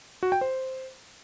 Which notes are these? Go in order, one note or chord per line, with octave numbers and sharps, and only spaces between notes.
F#4
G5
C5